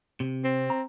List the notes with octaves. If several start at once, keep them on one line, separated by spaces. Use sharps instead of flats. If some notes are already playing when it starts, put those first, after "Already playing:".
C3
C4
A#5